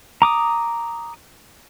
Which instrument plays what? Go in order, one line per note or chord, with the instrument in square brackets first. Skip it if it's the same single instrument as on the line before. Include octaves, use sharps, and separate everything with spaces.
[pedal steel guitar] A#5 D6 D#6